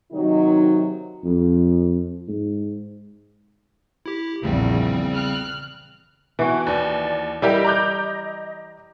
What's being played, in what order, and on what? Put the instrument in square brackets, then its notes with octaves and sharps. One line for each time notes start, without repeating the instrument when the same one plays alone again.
[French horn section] C3 D#3 F#3 D#4
[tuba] F2
G#2
[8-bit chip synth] E4 G4
[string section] A#1 E2 F3 [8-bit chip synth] C#3 G3 C4
[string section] F6 F#6
[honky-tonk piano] B2 [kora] E3 F#4
[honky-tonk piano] D#2 [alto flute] D5
[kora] G3 [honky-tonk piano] E4 G4 A#4 [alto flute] D#5
[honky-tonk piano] A#5 D6 G6